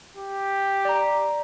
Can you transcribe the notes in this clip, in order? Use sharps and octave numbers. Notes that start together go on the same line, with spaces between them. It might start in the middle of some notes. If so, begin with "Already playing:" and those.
G4
D5 A#5